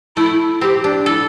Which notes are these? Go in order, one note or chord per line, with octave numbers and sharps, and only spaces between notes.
A3 E4
C4 G4
D4
E4 A4